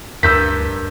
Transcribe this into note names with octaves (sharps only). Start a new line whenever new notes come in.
D2 G2 A#4 E6 G6 B6